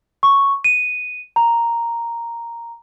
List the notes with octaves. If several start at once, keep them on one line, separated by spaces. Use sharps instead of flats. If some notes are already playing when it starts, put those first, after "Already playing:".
C#6
D#7
A#5